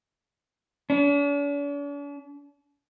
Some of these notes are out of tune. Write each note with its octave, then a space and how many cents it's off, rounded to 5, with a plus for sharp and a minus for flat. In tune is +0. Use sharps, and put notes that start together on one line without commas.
D4 -45